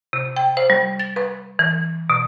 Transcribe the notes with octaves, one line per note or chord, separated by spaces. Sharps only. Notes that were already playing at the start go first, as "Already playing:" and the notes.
C3
G5
C5
G3
A6
B4
E3
B2